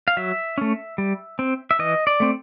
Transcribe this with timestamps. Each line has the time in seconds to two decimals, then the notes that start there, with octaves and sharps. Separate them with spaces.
0.08 F5
0.17 F#3 E5
0.58 A3 C#4
0.98 G3
1.39 C4
1.71 E5
1.79 E3 D#5
2.07 D5
2.20 A3 C4